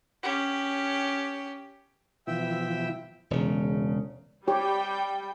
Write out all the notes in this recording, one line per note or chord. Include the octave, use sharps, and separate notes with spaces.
C#4 G4
B2 E3 F3 E5 G5 E6
E1 C#3
G3 G4 C#5 G5